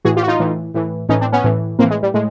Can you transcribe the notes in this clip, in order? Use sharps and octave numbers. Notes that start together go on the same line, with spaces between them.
A2 E3 F#4 G#4
F4 G4
F#4
D#4 F4
A2 E3
A2 E3
A2 E3 C#4 D#4
C4 D4
B3 C#4
A2 E3
A2 E3 A#3 C4
G#3
G3
A2 G#3